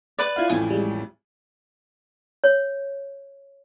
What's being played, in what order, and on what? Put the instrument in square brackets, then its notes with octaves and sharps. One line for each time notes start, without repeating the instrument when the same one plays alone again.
[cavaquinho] B4 D5
[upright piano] E4 F4 [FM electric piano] F5 G#6
[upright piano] A1 F2 A2 [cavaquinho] G#5
[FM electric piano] G3 G#3
[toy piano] C#5